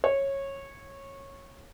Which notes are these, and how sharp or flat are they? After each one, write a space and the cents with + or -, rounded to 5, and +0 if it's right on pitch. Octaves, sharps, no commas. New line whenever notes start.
C#5 -15